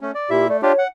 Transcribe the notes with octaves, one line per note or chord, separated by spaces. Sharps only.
A3 C#4
D5
A#2 E4 G4 E5
A3 D5
D4 F4 G4 C#5
F#5